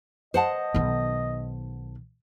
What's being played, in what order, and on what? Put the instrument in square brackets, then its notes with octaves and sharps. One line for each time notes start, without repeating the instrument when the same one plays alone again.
[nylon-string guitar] C5 F#5 A5 [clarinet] D#5
[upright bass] B1 D#3